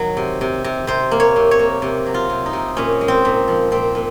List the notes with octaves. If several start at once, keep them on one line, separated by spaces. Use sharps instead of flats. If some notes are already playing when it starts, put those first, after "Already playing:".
Already playing: D#3 F#3
C3
C3
C3
C3 C5
A#3
C#5
C3
C#5
A#3
C3
F#3
F4
C3
D#4
C3
A#2 C#4
G#3
C4
A#2
F3
A#2 C4
A#2